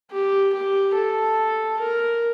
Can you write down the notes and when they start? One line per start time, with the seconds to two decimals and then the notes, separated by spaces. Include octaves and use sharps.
0.11 G4
0.54 G4
0.96 A4
1.80 A#4